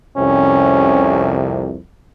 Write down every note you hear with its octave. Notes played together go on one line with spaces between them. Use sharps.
C2 F2 C3 C#4